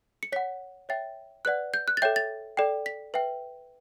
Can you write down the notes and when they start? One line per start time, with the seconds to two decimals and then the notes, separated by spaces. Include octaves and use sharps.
0.23 C#7
0.32 C#5 F#5 B6
0.89 C#5 E5 G5 A6
1.45 B4 D5 F#5 F#6
1.74 G6
1.88 F#6
1.97 A6
2.02 A4 C#5 E5 G5 G6
2.16 A6
2.57 A4 D5 G5
2.86 B6
3.14 B4 E5 G5